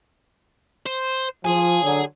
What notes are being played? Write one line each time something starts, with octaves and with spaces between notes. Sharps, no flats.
C5
F3 G#4 G#5
D3 F#3